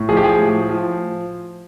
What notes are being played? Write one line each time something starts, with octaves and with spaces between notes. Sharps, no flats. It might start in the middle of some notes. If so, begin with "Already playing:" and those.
Already playing: A2
F3 G#4
G4
G#4
A2
F3